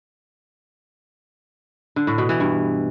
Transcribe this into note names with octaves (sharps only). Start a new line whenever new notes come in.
D3
A2
B2
E3
G2